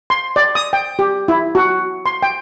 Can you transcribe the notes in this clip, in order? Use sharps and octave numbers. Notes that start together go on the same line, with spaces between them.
C6
D5
D#6
G5
G4
E4
F#4
C6
G5